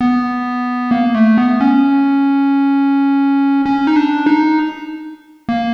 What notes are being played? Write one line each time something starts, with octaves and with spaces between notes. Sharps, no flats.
B3
A#3
A3
B3
C#4
C#4
D#4
D4
D#4
A#3